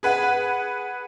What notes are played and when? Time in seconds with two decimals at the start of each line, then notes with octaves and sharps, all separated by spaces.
0.03 G#4 B4 F#5